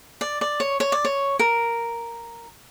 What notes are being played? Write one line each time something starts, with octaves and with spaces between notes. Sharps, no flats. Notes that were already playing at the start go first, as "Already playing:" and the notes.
D5
D5
C#5
C#5
D5
C#5
A#4